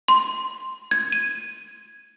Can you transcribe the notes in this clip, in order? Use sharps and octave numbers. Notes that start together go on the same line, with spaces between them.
C6
G#6
D#7